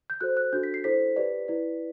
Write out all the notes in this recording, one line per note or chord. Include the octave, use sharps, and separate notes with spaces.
G6
F#4 A4 C5 F#6
F#6
D4 F#4 A4 G6
B6
C7
E4 A4 C5 B6
G4 B4 D5
E4 B4 D5